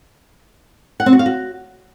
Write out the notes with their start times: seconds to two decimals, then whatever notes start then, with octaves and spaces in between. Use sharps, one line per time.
1.00 F#5
1.06 C4
1.13 F#4
1.19 F5
1.26 F#4